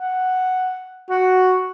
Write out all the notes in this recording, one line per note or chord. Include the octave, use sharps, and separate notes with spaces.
F#5
F#4